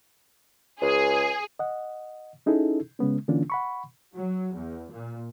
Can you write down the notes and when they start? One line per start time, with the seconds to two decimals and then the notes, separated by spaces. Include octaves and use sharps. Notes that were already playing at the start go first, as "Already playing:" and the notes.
0.82 C#2 G#4
1.59 D#5 F#5
2.46 C#4 D#4 E4 G#4 A4
2.99 C#3 G#3 B3 C#4
3.28 D3 E3 A#3 C#4 D4 F4
3.50 F#5 B5 C#6
4.16 F#3
4.56 E2
4.92 A#2